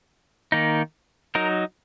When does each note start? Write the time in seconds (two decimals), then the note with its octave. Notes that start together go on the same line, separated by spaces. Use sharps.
0.52 D#3 A#3 D#4
1.35 F#3 D#4 A#4